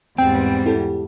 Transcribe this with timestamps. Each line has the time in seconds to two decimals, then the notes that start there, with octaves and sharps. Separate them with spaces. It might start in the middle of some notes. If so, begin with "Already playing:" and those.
0.18 E2 G#2 G3 C4 G5
0.66 E4 G4 A4